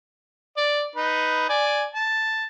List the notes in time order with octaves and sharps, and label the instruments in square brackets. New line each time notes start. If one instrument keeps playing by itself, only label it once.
[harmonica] D5
D#4 B4
D5 G#5
A5